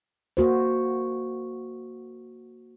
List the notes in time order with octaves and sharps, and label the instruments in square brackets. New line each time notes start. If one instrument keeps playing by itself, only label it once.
[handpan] A#3 F#4 C5